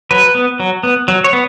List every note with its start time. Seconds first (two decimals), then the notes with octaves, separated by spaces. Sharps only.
0.11 F#3 B4
0.35 B3
0.60 F#3
0.83 B3
1.08 F#3
1.24 C#5
1.33 B3